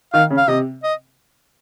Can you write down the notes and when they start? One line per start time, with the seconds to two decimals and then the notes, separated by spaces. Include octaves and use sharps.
0.13 D#3 F5
0.30 C#3
0.37 F5
0.48 C3 D#5
0.83 D#5